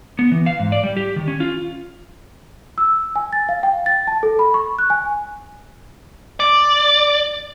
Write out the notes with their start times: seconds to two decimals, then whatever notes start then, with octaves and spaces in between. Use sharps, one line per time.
0.19 B3
0.32 E3
0.46 F5
0.59 G#2
0.72 D5
0.84 G3
0.97 G4
1.16 D#3
1.28 C#4
1.40 F4
2.78 E6
3.16 G#5
3.33 A6
3.49 F5
3.63 G5
3.86 A6
4.07 A5
4.23 A4
4.39 B5
4.54 C#6
4.79 F#6
4.90 G#5
6.40 D5